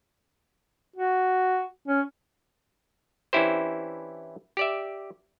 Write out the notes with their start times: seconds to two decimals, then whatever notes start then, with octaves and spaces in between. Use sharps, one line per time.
0.96 F#4
1.88 C#4
3.33 E3 C#4 D4 E4 G4 C5
4.57 G4 D5 E5